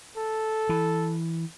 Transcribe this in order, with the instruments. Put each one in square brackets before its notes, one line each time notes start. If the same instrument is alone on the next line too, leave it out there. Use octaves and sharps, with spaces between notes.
[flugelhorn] A4
[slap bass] E3